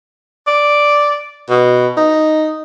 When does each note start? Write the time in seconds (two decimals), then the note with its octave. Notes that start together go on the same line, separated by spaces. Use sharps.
0.47 D5
1.50 B2
1.97 D#4